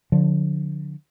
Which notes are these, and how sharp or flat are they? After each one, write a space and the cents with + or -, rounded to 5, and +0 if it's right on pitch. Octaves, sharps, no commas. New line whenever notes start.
D3 +0 F3 +35